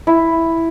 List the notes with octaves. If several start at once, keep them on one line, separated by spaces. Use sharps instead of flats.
E4